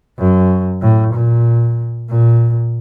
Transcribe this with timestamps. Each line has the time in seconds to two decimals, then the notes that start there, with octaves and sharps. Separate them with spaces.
0.19 F#2
0.82 A2
1.14 A#2
2.09 A#2